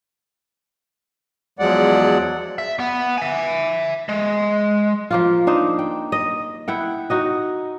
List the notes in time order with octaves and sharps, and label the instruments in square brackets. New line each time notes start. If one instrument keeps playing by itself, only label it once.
[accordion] E2 F3 F#3 G#3 D5 F#5
[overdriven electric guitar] E5
B3
E5 G#5
G#3
[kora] F3 A#3 F4
D4 D#4 C5
G5
D#5
E4 F#5 G5
D#4 F#4 D#5